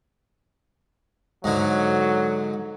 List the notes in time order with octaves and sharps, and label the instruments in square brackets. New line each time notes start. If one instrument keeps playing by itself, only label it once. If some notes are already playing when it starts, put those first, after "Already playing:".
[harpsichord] G#2 D3 [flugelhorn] F#3